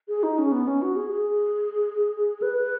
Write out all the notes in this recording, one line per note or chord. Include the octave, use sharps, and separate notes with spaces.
G#4
D#4
C#4
B3
C#4
F#4
G#4
G#4
B4